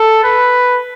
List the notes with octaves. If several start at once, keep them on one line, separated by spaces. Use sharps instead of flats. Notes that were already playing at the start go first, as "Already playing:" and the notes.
Already playing: A4
B4